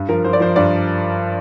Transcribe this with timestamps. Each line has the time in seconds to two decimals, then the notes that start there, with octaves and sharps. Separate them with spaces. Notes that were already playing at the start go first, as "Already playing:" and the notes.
Already playing: G2
0.09 F3 A#4
0.24 F3 C5
0.33 D5
0.40 F3 C5
0.56 G2 D5